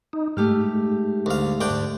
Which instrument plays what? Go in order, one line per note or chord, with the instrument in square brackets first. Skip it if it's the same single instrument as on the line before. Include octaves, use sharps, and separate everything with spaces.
[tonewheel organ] D#4
[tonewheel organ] G#2 [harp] A3 G4 F6
[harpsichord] D2 F5
D2 D4 G5